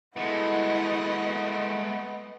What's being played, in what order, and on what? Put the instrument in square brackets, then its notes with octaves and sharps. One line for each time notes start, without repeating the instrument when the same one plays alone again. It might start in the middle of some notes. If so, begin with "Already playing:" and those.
[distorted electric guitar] G#3 A3 [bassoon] B3 [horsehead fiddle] E4 F#4 [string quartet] D#5